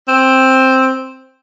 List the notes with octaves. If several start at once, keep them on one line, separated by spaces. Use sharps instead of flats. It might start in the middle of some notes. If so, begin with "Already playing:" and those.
C4